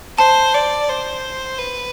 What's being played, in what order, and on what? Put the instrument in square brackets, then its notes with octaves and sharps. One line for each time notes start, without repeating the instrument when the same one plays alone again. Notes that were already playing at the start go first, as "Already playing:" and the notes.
[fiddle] C5 [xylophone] A5
[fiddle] D5
C5
B4